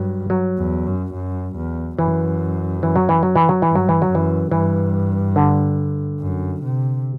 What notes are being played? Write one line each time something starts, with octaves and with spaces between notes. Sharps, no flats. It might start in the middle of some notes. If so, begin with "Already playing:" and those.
Already playing: G2 F#3
F#3
E2
F#2
F#2
E2
F#2 E3
E3
F#3
E3
F#3
E3
F#3
E3
G2
F#3
E3
F#3
F#2
E3
G2 E3
D3
F#2
C3